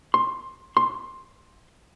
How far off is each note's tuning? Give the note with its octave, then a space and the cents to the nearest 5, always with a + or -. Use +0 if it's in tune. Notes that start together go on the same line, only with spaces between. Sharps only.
C6 +15
C6 +15